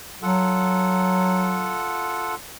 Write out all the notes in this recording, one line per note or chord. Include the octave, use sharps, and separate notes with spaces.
F#3 F4 A4 F#5